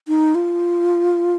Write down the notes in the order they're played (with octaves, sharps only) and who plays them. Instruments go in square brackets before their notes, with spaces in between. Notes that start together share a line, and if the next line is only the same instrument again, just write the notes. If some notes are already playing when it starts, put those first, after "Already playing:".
[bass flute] D#4
F4